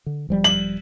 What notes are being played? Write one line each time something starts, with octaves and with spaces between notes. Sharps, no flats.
D3
E1 F3 G3
F#7